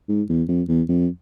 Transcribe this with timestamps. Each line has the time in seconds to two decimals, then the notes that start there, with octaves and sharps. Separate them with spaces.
0.09 G#2
0.29 E2
0.48 F2
0.68 E2
0.89 F2